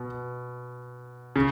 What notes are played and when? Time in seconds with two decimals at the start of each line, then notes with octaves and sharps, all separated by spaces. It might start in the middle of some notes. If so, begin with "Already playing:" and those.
Already playing: B2
1.36 C#3